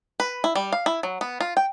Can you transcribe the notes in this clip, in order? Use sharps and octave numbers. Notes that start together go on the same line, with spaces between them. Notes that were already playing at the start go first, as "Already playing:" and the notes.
B4
E4
G3
F5
E4
F#3
B3
F4
G5